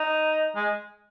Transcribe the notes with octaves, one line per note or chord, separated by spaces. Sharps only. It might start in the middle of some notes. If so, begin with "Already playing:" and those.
Already playing: D#4
G#3